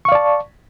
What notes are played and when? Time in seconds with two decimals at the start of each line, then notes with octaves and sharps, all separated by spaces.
0.05 C#6
0.09 F5
0.12 D5
0.15 A5